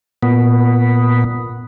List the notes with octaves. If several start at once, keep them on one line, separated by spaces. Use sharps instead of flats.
A#2 B3